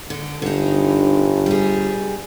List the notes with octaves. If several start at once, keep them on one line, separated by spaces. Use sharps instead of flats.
D3
G1 D3 D#4
G3 G#4